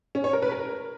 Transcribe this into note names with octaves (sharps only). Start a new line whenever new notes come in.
C#4
C#5
A#4
B4
A#4